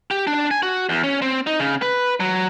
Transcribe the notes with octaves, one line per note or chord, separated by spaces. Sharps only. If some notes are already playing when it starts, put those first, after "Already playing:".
G4
D4
G#5
F#4
E2
C#4
C4
D#4
C#3
B4
F#3